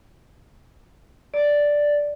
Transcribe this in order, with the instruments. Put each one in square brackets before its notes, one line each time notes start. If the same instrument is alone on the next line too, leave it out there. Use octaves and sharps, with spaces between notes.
[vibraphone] D5